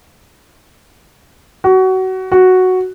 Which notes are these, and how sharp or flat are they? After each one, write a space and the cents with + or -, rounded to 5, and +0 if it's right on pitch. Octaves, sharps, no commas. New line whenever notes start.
F#4 +25
F#4 +0